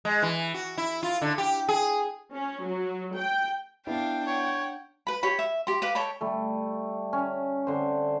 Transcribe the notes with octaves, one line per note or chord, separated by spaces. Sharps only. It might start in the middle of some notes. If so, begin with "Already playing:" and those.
G#3
E3
F#4
E4
F4
D3
G4
G#4
C#4
F#3
G5
B3 D4 E4 F5 G5
C#5 F#5
B4 B5
G4 C#5 B5
E5
G4 C6
G4 B4 F5
A4 C#5 G5 B5
G3 A3
C#4
D3 C4 C5